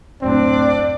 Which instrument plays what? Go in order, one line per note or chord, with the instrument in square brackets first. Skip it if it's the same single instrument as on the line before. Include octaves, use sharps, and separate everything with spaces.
[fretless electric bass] D1 F#2 A2 [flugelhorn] C4 [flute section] D4 D5